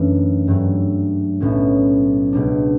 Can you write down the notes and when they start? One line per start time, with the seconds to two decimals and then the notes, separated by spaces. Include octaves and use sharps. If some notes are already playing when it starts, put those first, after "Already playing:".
Already playing: F#2 E3 A3 D4
0.48 G2 F#3 A3
1.40 B1 A2 F#3 C#4
2.32 C#2 B2 G3 D4